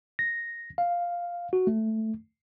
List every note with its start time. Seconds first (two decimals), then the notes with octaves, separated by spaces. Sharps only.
0.19 A#6
0.78 F5
1.53 F#4
1.67 A3